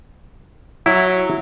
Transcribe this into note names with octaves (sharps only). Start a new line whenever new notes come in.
F#3 E4